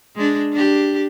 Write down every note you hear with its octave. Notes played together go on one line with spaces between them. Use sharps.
G#3 D4
D4 G4